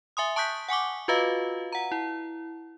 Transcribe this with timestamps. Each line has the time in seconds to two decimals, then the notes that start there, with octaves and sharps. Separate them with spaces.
0.17 E5 G#5 C6 D#6
0.36 A5 C#6 D#6 F#6 G6 B6
0.68 F#5 G#5 C#6 D6
1.08 F4 F#4 B4 D#5 F5
1.72 F#5 A#5
1.92 E4